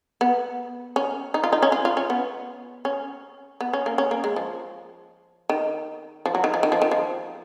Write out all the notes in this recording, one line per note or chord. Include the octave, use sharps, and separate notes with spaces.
B3
C#4
D#4
F4
D#4
C#4
F4
F4
C#4
B3
C#4
B3
C#4
A#3
C#4
A#3
G#3
F3
D#3
F3
F#3
D#3
F3
D#3
F3
D#3
F3